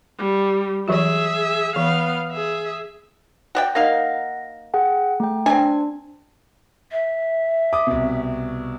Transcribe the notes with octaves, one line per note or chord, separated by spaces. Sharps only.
G3
E3 F#3 F#4 G#4 E5
E3 B3 F5
G#4 E5
F#4 D5 G5
A#3 D#4 F5 F#5 A#6
G#4 F#5 G5
A3 G5
C4 D4 G#5
E5
D6 D#6
C2 B2